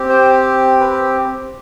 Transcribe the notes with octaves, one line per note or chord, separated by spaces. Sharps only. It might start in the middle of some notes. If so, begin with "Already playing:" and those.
Already playing: C4 G4
C5
B4